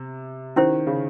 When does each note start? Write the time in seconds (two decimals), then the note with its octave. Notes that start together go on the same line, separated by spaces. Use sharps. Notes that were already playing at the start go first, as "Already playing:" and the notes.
Already playing: C3
0.56 D#3 C#4 E4 G4 C5
0.87 C#3